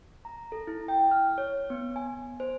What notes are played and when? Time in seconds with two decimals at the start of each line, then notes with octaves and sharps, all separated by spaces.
0.25 A#5
0.52 A4
0.67 E4
0.88 G5
1.11 F6
1.38 C#5
1.70 B3
1.96 G#5
2.40 C5